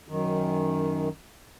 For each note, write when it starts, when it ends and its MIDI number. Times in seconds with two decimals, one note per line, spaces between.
0.08 1.09 42
0.08 1.09 51